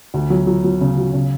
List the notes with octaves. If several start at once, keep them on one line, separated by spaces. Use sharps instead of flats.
D2
F#3
F#3
F#3
C#3
F#3
C#3